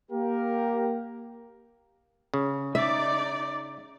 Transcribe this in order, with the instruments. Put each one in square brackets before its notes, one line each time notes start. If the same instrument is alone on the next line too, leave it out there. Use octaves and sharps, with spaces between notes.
[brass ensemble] A#3 G4 A#4
[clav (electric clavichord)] C#3
[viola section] D#4 D5 [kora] E5